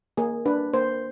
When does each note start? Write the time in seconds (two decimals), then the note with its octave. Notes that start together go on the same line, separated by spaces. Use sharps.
0.17 A#3 G#4
0.46 D4 B4
0.74 A#3 C5